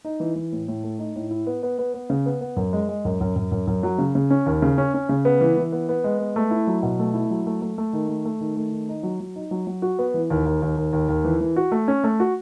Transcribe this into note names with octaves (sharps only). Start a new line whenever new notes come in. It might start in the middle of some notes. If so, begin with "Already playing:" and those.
D#4
E3
E3
A2
A2
A3
D#4
A2
E4
B3
B3
B3
B3
C#3
B3
B3
F#2
G#3
G#3
F#2
F#2
F#2
F#2
F#2
F#3
C#3
C#3
C#4
D#2
C#3
C#4
C#4
C#3
B3
E3
E3
B3
B3
G#3
B3
A3
E4
F#3
B2
A3
E4
F#3
A3
A3
A3
D#3
A3
A3
D#3
A3
D#3
D#4
F#3
F#3
D#4
F#3
F#3
F#4
B3
E3
D#2
D#2
D#2
D#2
D#2
D#2
E3
E3
F#4
A3
C#4
A3
F#4